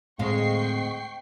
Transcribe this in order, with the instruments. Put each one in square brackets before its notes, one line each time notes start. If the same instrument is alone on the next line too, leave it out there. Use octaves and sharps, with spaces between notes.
[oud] D2 G#3 F5 [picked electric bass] A2 [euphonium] C4 [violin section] G5 C#6 C7